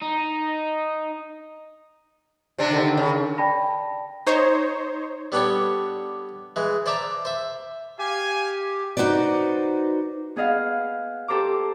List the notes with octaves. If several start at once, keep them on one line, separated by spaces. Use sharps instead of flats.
D#4
C3 C4 D4
D3 D#3
C#3
D5 G5 A5 B5 A#6
D#4 C5 C#5
G3 B3 D4 G4 A4 C#5
E3 G#3
C5 D5 E5 A5 A#5
C5 E5
G4 F5 G#5
D#4 F#4 B4 C5 D5
B3 G#4 B4 D#5 F5 F#5
G4 A4 C5 A#5 D6